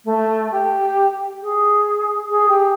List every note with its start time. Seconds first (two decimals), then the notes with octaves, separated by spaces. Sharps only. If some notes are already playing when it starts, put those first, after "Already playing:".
0.05 A3
0.51 G4
1.42 G#4
2.30 G#4
2.48 G4